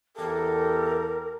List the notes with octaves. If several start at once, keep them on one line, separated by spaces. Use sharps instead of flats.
E2 G4 A4 A#4